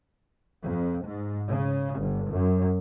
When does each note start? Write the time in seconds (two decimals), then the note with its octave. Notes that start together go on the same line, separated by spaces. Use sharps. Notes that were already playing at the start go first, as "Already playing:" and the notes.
0.63 F2
1.04 G#2
1.51 C#3
1.99 G1
2.33 F#2